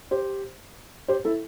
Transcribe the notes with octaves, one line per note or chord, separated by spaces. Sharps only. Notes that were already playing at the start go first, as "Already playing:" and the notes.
G4 C5
G4 C5
E4 A4